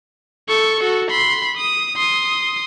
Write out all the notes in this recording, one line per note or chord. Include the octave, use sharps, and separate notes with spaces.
A4 C#6
F#4 A4
B5 C6
D#6
C6 D#6